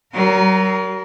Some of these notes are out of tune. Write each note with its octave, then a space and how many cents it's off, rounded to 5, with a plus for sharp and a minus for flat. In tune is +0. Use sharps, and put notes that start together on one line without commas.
F#3 +40 A#4 +0